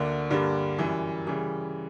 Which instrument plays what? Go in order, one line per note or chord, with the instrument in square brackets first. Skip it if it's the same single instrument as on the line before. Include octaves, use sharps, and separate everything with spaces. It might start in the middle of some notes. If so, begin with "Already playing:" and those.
Already playing: [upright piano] D2 D3 A#3 D4
G2 D3 G3 A#3
F#2 E3 G3
C#3 E3 G3